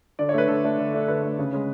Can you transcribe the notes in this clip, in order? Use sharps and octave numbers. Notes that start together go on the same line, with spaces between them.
D3 D5
C#5
A3 D4 B4
D3 A4
A3 D4
D3
A3 D4
D3 B4
A3 D4
C#3
G#3 C#4